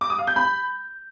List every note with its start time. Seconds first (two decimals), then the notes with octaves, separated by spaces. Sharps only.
0.01 D6
0.10 D#6
0.19 F5
0.27 G6
0.36 B5